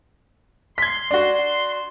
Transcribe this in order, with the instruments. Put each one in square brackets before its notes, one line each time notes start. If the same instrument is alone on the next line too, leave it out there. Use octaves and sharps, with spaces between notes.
[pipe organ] C6 [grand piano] G#6 B6
[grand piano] D4 F#4